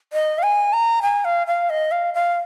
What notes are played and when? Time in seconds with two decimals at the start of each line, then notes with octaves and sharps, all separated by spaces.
0.13 D#5
0.38 F5
0.43 G#5
0.73 A#5
1.02 G#5
1.25 F5
1.47 F5
1.70 D#5
1.91 F5
2.14 F5